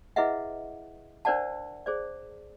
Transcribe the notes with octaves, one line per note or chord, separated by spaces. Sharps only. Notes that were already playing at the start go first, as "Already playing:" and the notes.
E4 G#4 B4 D#5 E5 F#5
D4 A#4 C5 D5 F#5 A5
G#4 C5 D5